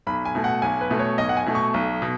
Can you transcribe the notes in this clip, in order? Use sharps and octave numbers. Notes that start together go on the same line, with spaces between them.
B1 B5
G#5
B2 A3
F#5
B1 G#5
B4
B2 A3
C#5
B1 D#5
F#5
G#5
B2 A3
C#6
B1
B2